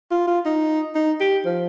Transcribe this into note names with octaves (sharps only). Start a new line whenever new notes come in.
F4
F4
D#4
D#4
G4
F3